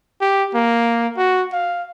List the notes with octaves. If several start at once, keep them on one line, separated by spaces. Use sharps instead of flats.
G4
A#3
F#4
F5